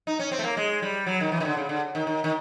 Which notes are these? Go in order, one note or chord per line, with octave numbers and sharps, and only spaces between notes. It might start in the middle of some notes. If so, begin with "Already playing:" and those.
D#4
C#4
C4
A3
A#3
G#3
G3
F#3
D#3
E3
D#3
D3
C#3
D3
D#3
D#3
D#3